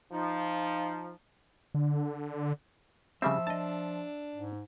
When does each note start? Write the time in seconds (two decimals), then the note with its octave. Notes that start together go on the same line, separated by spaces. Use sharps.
0.12 F3 D#4
1.74 D3
3.22 C#3 F3 G3 C4 E5
3.47 D4 D#5 A5
4.36 G#2